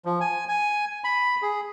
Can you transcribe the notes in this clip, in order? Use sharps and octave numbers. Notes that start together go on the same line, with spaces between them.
F3
G#5
G#5
B5
G#4